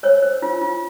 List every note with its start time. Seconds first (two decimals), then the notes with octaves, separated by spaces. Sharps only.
0.03 C5 C#5
0.22 C5
0.42 F4
0.61 F4